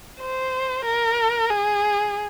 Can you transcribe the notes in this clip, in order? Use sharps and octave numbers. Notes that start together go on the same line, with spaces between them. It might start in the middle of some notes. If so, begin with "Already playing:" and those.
C5
A#4
G#4